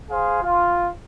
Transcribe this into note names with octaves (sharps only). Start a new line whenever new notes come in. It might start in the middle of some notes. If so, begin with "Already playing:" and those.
G#4 C5 F5
F4